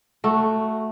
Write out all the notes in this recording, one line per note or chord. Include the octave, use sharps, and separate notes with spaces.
A3 F#4